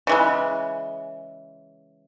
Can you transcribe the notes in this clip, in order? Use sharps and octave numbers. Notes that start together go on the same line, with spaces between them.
C#3 E3 G#3